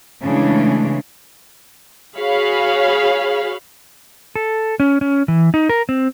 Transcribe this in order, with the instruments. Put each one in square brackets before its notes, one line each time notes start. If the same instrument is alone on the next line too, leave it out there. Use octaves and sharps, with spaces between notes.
[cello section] C#3 E3 G#3 A3 C#4 D4
[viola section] F#4 G#4 C#5 F5 B5
[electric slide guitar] A4
C#4
C#4
E3
D#4
A#4
C4